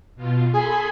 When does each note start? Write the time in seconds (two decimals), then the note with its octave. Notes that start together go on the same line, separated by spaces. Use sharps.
0.16 B2 F4
0.53 G#4 A4 B5 C6